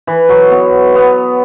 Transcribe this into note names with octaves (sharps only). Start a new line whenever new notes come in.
E3
F#3
B3
B3